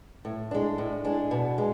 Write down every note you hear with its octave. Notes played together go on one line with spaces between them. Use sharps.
A2
G#3 D4
A2
G#3 D4
B2
G#3